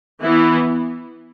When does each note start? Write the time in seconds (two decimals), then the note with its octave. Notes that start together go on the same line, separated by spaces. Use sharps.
0.21 E3 B3 E4